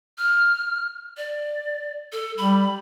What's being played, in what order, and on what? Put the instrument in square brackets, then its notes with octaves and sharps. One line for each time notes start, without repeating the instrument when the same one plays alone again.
[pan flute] F6
D5
A4
[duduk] G3 [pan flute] B5